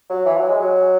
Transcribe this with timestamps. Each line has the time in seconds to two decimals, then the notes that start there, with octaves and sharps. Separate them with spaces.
0.10 F#3
0.26 E3
0.37 F#3
0.48 G#3
0.60 F#3